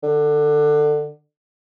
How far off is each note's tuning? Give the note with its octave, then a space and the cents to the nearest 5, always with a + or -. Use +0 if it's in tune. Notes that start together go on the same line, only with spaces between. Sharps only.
D3 +20